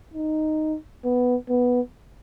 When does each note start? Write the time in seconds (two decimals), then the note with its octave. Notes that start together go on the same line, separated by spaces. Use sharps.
0.14 D#4
1.04 B3
1.49 B3